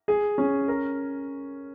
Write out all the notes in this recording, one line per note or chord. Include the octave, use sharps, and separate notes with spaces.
G#4
C#4
A#4